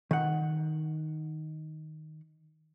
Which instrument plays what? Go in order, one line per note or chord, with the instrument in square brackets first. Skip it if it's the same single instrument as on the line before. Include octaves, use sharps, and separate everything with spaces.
[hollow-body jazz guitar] D#3 F#5